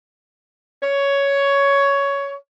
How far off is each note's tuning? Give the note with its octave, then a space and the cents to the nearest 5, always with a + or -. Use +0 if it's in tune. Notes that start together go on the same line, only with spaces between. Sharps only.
C#5 +10